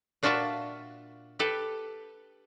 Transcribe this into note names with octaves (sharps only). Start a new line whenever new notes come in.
A#2 D4 F4 F#4 E5 A5
G4 A4 B4